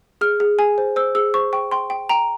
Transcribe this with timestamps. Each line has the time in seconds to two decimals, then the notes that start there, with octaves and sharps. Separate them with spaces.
0.21 G#4 F6
0.40 G#4
0.59 G#4 G#5
0.78 C5
0.96 C5 E6
1.15 G#4 E6
1.34 C5 C#6
1.53 G5 C#6
1.72 G5 C6
1.90 G5
2.09 G5 A#5